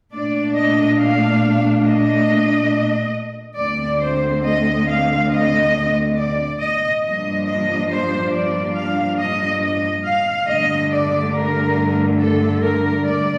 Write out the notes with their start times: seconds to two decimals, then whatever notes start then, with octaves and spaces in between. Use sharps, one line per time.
0.13 A#2 A3 D4 D5
0.56 D#5
1.00 F5
1.86 D#5
3.58 D2 D3 A3 C4 D5
4.01 C5
4.45 D#5
4.87 F5
5.31 D#5
6.16 D5
6.59 D#5
7.03 G2 F3 A#3 D4 D#5
7.45 D#5
7.89 C5
8.32 D5
8.75 F5
9.18 D#5
9.61 D#5
10.04 F5
10.47 G2 D3 A3 D#5
10.91 D5
11.33 A#4
12.20 A4
12.63 A#4
13.06 D5